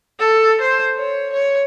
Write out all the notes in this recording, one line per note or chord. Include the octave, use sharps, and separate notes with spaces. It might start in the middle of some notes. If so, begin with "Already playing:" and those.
A4
C5
C#5
C#5